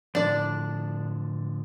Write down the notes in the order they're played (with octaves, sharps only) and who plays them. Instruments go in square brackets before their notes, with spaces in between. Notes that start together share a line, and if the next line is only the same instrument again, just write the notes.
[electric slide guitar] A2 D3 F3 [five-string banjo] D4 D5